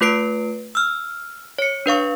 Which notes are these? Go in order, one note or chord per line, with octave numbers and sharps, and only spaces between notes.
A3 F4 B4 C7 D7
E6 F6
C#5 C#7
D4 B4 F5 C#6